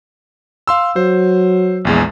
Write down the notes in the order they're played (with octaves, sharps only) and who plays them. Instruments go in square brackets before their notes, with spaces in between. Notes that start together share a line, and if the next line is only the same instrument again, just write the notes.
[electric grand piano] F5 C6 E6
[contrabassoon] F#3 [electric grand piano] C5
[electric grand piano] A#1 E2 G#3